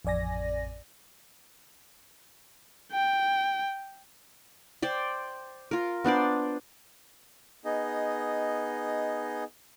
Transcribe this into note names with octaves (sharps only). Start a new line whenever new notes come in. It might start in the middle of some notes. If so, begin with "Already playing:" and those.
A1 F2 D5 G#5 A#6
G5
C5 D5 G5
F4 A#4
B3 D4 C5 D5
B3 D#4 G#4 D#5